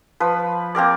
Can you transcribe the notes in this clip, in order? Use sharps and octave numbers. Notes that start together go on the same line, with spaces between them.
F3 B4
A#3 C4 A#4 D5